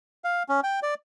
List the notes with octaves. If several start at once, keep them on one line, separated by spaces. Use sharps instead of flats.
F5
C#4
G5
D5